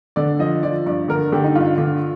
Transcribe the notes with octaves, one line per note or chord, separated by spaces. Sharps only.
D3 D5
F3 D#5
F3 D5
G2 D5
D3 A#4
D3 G4
D#4
G2 F4
D3